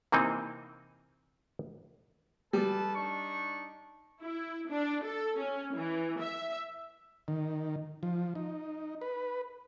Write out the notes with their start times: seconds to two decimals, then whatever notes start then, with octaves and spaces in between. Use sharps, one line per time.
0.12 C3 E3 A#3 C4 D#4
2.53 G3 A4 B4 A5
2.95 D4 D#4 C#6
4.21 E4
4.70 D4
5.04 A4
5.40 C#4
5.75 E3
6.20 E5
7.28 D#3
8.03 F3
8.35 D#4
9.01 B4